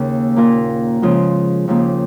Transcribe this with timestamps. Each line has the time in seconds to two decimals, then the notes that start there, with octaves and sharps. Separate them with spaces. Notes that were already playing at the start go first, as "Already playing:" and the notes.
Already playing: D#2 C#3 A#3
0.36 A#2 A#3 F4 A#4
1.02 C#3 F3 G#3 F4
1.68 D#2 C#3 F3 A#3